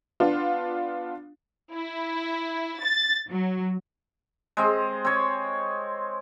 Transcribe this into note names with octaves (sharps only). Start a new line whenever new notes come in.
B3 D4 F4
E4
A6
F#3
G#3 C4
C4 C#5